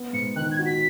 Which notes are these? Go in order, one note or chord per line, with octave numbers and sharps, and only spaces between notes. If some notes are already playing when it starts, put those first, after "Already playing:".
Already playing: B3
G#2 C#7
D#3 F#6
G#6
F#4
B6